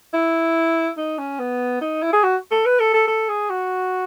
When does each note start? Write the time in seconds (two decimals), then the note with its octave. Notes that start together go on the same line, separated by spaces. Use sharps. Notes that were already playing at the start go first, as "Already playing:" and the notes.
0.13 E4
0.97 D#4
1.18 C#4
1.39 B3
1.81 D#4
2.02 E4
2.13 G#4
2.23 F#4
2.51 A4
2.65 B4
2.80 A4
2.93 A4
3.07 A4
3.28 G#4
3.50 F#4